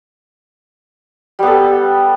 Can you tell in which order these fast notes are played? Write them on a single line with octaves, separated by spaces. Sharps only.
G3 B3 A4